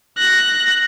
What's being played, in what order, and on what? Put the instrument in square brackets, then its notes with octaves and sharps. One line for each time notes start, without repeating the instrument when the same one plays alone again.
[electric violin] F#6 A#6